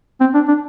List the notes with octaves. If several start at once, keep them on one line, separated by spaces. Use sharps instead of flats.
C4
D4
D4